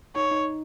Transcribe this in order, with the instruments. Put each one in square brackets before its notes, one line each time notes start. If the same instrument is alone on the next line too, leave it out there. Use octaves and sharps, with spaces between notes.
[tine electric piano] D#4 [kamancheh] C#5
[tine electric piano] D#4